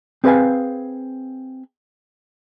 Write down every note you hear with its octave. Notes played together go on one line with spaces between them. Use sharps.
C4 G#4 B4 F5 G#5